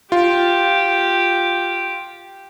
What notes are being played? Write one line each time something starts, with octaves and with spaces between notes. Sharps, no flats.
F4 G4